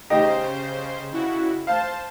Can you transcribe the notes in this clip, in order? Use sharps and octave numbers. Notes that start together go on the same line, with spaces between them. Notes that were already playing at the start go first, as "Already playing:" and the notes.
C#3 D#4 G4 C5 D#5
C#3 E4 F#4
C5 F5 A5